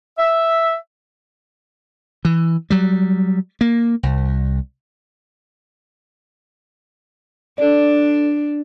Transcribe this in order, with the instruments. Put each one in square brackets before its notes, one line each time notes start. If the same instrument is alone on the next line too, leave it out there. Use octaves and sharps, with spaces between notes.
[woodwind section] E5
[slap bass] E3
F#3 G3
A#3
C2
[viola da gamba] D4 [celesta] A4 D5